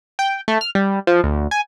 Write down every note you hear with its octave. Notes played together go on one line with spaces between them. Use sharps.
G5
A3
F6
G3
F3
D2
G#5